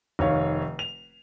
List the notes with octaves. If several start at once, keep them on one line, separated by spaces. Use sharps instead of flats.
F1 D#3 C#5 F5
F7